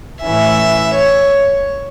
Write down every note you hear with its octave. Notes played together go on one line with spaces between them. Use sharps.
A2 E3 C#4 E5
C#5